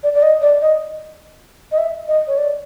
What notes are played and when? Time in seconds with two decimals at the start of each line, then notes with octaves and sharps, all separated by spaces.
0.03 D5
0.14 D5
0.23 D#5
0.42 D5
0.61 D#5
1.72 D#5
1.78 E5
2.08 D#5
2.28 C#5
2.38 D5